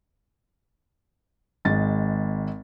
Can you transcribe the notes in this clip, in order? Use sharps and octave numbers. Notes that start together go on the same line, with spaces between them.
G#1 G#3 A6